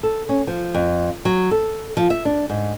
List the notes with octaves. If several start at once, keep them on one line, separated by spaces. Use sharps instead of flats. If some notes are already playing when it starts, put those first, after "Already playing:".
A4
C#4
F3
F2
F#3
A4
F3
E5
D4
G#2